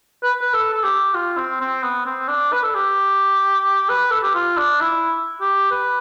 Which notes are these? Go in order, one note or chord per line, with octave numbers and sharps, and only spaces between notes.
B4
B4
A4
A4
G4
F4
C4
C4
B3
C4
D4
B4
A4
G4
B4
A4
G4
F4
D4
E4
G4
B4